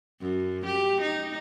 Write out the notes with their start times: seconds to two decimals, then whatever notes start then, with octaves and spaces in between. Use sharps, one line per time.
0.21 F#2
0.66 G4
1.01 D#4